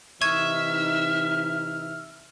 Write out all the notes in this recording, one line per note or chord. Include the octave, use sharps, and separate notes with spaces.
C3 E3 D#4 E5 C#6 F6 G#6 D#7